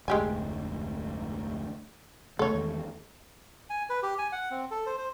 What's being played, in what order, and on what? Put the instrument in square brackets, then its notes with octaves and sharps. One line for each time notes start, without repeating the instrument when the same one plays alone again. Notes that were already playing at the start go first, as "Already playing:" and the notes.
[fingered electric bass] F1 D2 G#2 [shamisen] G#3 G4 G#5
[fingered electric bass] E1 C#3 A3 [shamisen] A4 C#5
[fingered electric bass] E2 D#3 G#3
[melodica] G#5
B4
G4
G#5
F#5
C4
A4
C5
C5